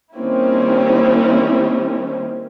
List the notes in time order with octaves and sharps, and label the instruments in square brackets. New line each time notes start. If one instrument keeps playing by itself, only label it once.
[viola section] D#3 G3 A#3 C4 C#4 E4